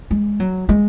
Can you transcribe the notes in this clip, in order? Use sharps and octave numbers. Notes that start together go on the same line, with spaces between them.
G#3
F#3
G#3